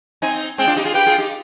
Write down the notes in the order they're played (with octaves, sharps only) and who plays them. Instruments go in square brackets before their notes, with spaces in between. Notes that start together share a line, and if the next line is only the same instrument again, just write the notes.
[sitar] C4 D#4 [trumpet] G#5
[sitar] G#3 C4 [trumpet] G5
[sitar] D4 F4
D#4 G4
F4 G#4
[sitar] G4 B4 [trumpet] G5
[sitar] F4 G#4
D#4 G4